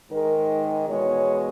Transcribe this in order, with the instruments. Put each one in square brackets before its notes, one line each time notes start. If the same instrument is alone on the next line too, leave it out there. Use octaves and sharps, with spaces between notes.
[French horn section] G#2 D#3 G#3 A#4
E2 B2 G#3 C#5